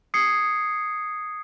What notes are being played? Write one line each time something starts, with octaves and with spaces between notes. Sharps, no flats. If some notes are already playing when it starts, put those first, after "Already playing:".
D#6 G#6 C7 C#7